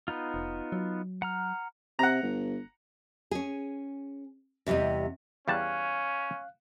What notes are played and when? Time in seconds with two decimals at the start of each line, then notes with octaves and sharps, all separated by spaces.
0.08 B3 D#4 F4
0.34 F1
0.72 F#3
1.22 F#5 A#5 F6
1.99 C3 F#5 A#5
2.23 G1
3.31 C#4 G#4
4.66 E2 C3 G3 G4 D#5
5.48 E2 G3 C#4 F5 A5 F#6